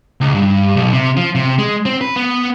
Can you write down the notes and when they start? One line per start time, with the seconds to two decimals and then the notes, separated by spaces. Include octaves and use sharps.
0.21 C#2
0.34 G2
0.77 B1
0.93 C3
1.17 F3
1.35 C3
1.58 G#3
1.86 C4
2.01 B4
2.16 B3